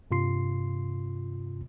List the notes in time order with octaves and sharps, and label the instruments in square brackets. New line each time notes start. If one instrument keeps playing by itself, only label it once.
[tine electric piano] G2 C3 F4 C6 C7